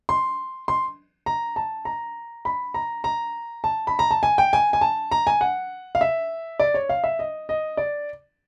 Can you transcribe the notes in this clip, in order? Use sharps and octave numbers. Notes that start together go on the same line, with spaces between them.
C6
C6
A#5
A5
A#5
B5
A#5
A#5
A5
B5
A#5
A5
G#5
G5
G#5
G#5
A5
A#5
G#5
F#5
F5
E5
D5
C#5
F5
E5
D#5
D#5
D5